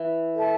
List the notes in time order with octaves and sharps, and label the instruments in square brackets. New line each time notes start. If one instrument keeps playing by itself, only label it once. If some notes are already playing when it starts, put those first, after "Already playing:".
Already playing: [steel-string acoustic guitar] E3
[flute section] A4 E5 A5